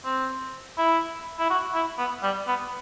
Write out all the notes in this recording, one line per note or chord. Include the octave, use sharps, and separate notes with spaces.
C4
E4
E4
F#4
E4
B3
G3
B3